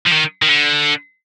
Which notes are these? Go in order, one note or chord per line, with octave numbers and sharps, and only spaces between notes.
F3
D#3
D#3
D3